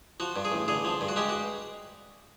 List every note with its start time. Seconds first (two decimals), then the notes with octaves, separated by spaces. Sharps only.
0.20 F3 F#4
0.36 G2
0.45 G#4
0.52 A1
0.68 D3 G#4
0.85 F3
1.01 G2
1.08 F#4
1.16 G#3 G4
1.29 F#4